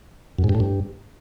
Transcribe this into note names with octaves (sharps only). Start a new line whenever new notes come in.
F#2
G#2
G2
A2
G2